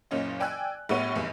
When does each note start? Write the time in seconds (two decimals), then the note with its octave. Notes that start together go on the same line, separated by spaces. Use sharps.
0.11 F#1 A#2 C#4 D#5
0.40 D5 G5 G#5 E6 F#6
0.89 A#1 A2 G3 B3 C#5 D#7
1.16 F1 E2 G2